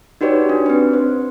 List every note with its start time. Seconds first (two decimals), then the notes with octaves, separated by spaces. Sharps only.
0.21 D#4 F#4 G4 B4 C#5 D5
0.49 D4
0.66 C4 B4
0.93 C5